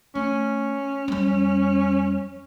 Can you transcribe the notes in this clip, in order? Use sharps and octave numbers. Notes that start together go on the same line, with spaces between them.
A3 C#4
F2 G3